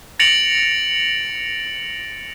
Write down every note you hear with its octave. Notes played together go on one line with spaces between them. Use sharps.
A6 A#6 C#7 D7 F7 F#7